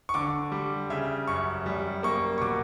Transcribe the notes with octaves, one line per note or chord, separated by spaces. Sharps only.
C#6
D3 D6
G3
C#3 E5
F#2 C#6
G3
A#3 C#6
C#6
B2 D6